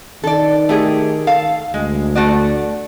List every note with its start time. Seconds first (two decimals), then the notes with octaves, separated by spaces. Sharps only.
0.23 D#3 A4 D5
0.69 A3 G4 G#4
1.27 A4 F5
1.74 D2 G#3
2.15 A3 F#4 D5